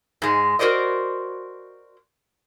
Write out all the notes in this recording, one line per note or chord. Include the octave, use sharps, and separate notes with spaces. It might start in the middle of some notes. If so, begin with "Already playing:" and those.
G#2 G#3
F#4 A#4 C5 D5 D#5